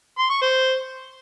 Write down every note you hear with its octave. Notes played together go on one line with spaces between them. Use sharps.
C6
C#6
C5